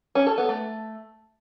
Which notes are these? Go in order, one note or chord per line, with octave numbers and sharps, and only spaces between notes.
C#4
A4
B3
A3